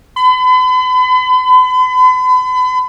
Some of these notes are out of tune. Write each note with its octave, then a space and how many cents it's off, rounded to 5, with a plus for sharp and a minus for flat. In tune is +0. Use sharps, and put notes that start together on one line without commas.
B5 +40